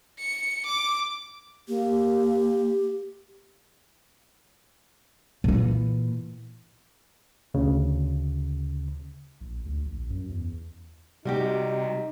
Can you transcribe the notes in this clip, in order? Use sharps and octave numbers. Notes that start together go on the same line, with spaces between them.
C#7
D6
A#3 G4
A#2 E3
D2 C#3
A#1
D2
A#1
F#2
E2
C3 G3 D#4 F#4 G4